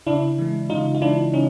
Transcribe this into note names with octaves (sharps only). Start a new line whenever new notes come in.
C#3 D4 E4
E3 G#3
C#3 D#4 F4
F4
E3 G#3 D4 E4
C#3 C#4 D#4